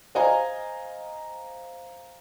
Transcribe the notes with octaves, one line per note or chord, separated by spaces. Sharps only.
C5 D#5 F5 G#5 A#5